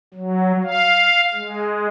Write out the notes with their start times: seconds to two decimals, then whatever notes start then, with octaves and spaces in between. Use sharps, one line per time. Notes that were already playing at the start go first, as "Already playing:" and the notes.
0.14 F#3
0.64 F5
1.34 G#3